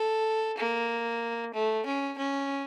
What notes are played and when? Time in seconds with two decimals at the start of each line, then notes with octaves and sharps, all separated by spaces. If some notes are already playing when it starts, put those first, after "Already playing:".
Already playing: A4
0.58 A#3
1.54 A3
1.86 C#4
2.18 C#4